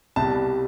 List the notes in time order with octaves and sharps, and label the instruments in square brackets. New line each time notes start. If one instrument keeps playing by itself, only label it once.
[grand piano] C2 B2 G3 A5